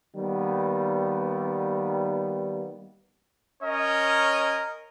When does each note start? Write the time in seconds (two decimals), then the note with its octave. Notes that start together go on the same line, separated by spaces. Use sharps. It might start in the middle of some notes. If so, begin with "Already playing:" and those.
0.15 D#3 G3 A#3 B3
3.62 C#4 A#4 C#5 D#5